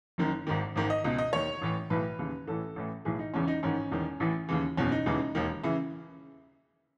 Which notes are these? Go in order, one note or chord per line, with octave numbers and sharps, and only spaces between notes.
F#1 F#2 D#3
G#1 G#2 D#3
G#1 G#2 D#3
D#5
C#2 B2 D#5
D#5
D#2 D#3 C#5
A1 A2 E3
B1 A2 E3 B4
D#2 C#3 E3
A1 A2 E3 A4
A1 A2 E3
B1 A2 E3 G#4
D#4
E1 E2 C#3 E3 C#4
D#4
A1 G#2 D#3 C#4
E1 E2 D#3
A1 A2 E3
D#2 C#3 E3
F#1 E2 B2 C#4
D#4
E1 D#2 C#3 E3
E1 D#2 D#3
C#3 E3 E4